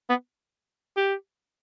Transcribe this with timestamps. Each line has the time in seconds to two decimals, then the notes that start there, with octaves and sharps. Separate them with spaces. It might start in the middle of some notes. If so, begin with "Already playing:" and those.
0.09 B3
0.97 G4